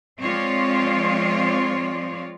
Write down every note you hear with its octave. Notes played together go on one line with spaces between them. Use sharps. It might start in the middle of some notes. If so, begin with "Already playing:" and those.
F3 G#3 C4 F4 C#5 D5